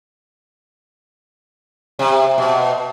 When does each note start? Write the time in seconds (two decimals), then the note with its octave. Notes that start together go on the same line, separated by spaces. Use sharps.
1.99 C3
2.38 B2